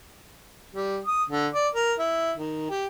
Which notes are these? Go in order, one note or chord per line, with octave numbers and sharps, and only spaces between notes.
G3
D#6
D3
D5
A#4
E4
D#3
G4